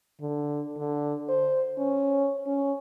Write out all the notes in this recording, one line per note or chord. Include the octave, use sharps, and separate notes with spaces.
D3
D3
C5
C#4
C#4